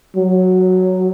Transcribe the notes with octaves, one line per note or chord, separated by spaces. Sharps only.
F#3